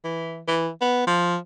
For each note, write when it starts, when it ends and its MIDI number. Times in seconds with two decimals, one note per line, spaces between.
0.04 0.41 52
0.47 0.69 52
0.81 1.04 59
1.07 1.37 53